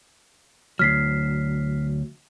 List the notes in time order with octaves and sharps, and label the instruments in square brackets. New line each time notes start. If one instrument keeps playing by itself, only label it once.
[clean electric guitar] D2 F#3 [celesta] F6 B6 C7